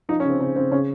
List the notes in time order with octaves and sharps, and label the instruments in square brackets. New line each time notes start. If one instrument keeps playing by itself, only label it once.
[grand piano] F3 D#4
C#4
C#3
C4
C#3 C4
C#3 C4
C#3 C#4